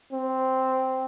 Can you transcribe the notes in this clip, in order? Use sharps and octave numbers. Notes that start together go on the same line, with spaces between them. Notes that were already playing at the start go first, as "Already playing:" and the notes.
C4